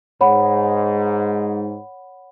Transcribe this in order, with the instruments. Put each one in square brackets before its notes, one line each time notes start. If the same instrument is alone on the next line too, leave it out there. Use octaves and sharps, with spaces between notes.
[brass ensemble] G#2 [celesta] C#5 F#5 B5